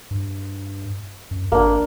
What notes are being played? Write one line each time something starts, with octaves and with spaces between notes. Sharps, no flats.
G2
F#2
G#1 A#3 D4